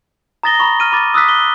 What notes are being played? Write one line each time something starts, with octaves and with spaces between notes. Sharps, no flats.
A#5 D#6 A6 A#6 G7
A#5 B5 C#6
F6 D#7
B5 D6 A6
D#6 E6 F#6 B6
G7